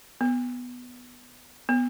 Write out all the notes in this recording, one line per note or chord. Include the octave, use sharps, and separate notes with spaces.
B3
B3